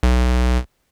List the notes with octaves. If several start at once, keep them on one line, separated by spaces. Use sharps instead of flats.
B1